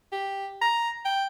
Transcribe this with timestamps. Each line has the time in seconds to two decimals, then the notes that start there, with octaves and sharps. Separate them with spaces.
0.12 G4
0.62 A#5
1.05 G5